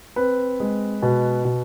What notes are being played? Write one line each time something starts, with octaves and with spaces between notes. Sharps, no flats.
C4 B4
G#3
B2
B2